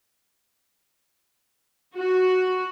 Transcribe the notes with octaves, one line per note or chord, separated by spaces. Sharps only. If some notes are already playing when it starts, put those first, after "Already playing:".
F#4